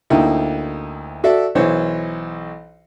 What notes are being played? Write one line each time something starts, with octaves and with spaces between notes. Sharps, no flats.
D2 A#3 D#4 E4 G5
F#4 A4 D5 E5
B1 E3 C5 C#5